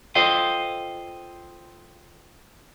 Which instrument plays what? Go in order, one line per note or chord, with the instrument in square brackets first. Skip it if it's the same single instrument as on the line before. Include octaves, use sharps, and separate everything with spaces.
[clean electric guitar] F4 A4 C5 D#5 F5 G5